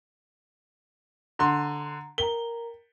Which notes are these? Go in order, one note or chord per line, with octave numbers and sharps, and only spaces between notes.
D3 A#5 C6
A#4 G5 A#5 G7